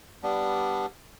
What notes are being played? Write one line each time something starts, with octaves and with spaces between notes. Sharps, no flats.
G3 B3 D4